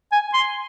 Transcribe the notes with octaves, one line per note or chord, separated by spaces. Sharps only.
G#5
C6